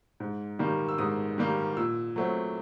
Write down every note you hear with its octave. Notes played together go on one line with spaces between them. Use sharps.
G#2
D#3 G3 A#3
E6
G#2 D#6
D#3 G3 A#3
A#2 E6
F#3 A3 C4